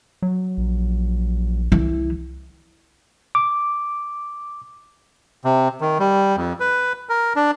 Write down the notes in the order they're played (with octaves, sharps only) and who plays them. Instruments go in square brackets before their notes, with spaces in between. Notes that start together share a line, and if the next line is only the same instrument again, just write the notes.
[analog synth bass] F#3
[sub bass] A#1
[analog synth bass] C2 [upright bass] E3
[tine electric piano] D6
[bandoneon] C3
D#3
G3
F2
B4
A#4
D4